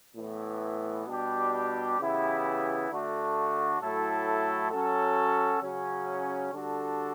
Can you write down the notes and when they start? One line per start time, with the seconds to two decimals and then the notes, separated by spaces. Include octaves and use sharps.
0.16 A2 E3 B3
1.07 B2 G3 D4 G4
1.99 C#3 E3 B3 E4 G4
2.90 D3 A3 D4 F#4
3.81 A2 F#3 A3 E4 A4
4.71 F#3 C#4 F#4 A4
5.62 C#3 F#3 C#4
6.53 D3 G3 D4 F#4 A4